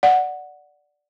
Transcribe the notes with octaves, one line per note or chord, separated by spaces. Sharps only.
D5 F#5